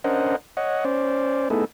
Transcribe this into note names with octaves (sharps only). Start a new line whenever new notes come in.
C#4 D4 A#4 C5 D#5 F#5
C#5 D#5 F#5
C#4 C5 D5
A3 B3 D#4 E4 G#4 A4